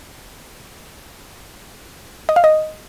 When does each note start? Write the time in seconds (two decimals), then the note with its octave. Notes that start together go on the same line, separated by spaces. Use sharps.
2.29 D#5
2.36 F5
2.44 D#5